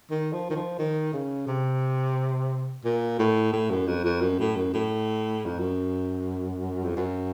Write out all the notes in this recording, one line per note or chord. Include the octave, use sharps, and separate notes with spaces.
D#3
F3
D#3
F3
D#3
C#3
C3
A#2
A2
A2
F#2
F2
F2
F#2
A2
F#2
A2
F2
F#2
F2
F#2